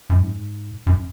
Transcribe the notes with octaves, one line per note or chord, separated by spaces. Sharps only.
F#2
G#2
F#2